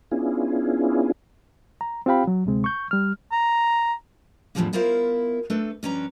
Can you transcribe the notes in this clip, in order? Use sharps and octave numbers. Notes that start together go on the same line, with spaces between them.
B3 C#4 D4 E4 F4 G#4
A#5
C4 F4 G4 F5 G5 B5
F#3
D2 C3 G#3 C4
C#6 G6
G3 F6
A#5
E2 A2 D3 F3 G3 A#3
B3 E4 F4 A#4 C5 F5
A3 D4 A4 B4
G2 F3 C#4 D4 B4 A#5